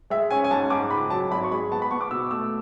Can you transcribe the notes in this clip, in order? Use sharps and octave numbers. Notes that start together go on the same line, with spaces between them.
G#3 E5
C#4 G#5
G#5
G#2 A5
G#2 D6
C#2 B5
F#3 A5
G#1 B5
C#6
G#3 B5
B3 A5
B5
B3 C#6
D6
B2 E6
A3 E6